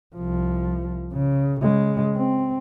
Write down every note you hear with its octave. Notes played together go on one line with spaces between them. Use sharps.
C2 F3
C#3
C#3 G#3
C4